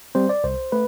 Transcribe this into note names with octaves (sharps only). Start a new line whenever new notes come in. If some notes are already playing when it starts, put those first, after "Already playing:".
G3 C4 C5
D5
C2 C5
A3 B4